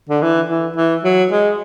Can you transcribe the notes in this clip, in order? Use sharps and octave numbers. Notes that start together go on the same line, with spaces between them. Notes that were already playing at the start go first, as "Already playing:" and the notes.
D3
E3
E3
E3
F#3
G#3